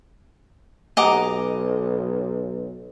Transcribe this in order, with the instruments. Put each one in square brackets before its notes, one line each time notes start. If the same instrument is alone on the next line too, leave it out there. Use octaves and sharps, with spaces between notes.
[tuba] B1 [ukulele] G4 F#5 G#5 [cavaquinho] D#5 A#5 D6